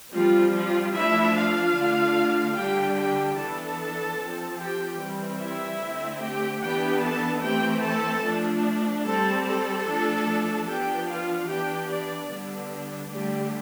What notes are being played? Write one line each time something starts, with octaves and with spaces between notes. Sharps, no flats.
F3 G3 C4 F4
F3 F4
F3 A3 D4 E4 E5
F4 F5
D3 A3 D4
D3 G3 D4 G4 G5
G4 G5
E3 B3 D4 A4 A5
F3 C4
G4 G5
E3 G3 C4
E4 E5
D3 A3 C4
G4 G5
E3 B3 D4 G4 G5
A4 A5
E3 A3 C4 G4 G5
A4 A5
F3 A3 D4
G3 C4 A4 A5
A4 A5
F3 A3 D4
F3 B3 D4 G4 G5
F4 F5
E3 B3 D4 G4 G5
D4 D5
D3 G3 B3 D4
D3 G3 A3 D4 G4